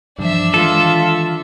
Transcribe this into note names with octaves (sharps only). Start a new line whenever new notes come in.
G2 E3 F3 D4 E5
D#3 E3 G#3 F4 A4